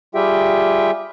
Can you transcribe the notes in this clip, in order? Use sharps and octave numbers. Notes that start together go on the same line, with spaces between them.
G3 F4 G4 G#4 E5 G5